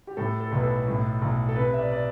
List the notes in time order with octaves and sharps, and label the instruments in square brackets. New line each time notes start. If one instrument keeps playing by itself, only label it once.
[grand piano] G4
A2 A4
A4
B1 B4
A4
A2
B1
A4
C3 B4
E5
D5
D5